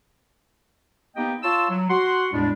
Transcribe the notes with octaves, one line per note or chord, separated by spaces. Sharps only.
A#3 B3 D#4 G4 D#5 G5
F4 C#5 A5 C6 E6
F#3
F#4 F#5 C6
E2 A2 G3 G#3 D4